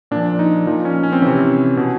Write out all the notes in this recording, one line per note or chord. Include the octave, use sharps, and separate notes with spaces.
A#2 F3 D4
D#4
A#2 F3 D#4
C#4
C#4
C4
C3 E3 C#4
B2